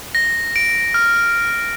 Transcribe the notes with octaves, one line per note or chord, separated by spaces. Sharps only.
A#6
D7
F6